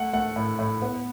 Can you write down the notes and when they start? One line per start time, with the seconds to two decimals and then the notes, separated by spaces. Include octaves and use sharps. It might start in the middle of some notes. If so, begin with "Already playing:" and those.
Already playing: A3 F#5
0.13 A3 F#5
0.36 A2
0.59 A2
0.82 B3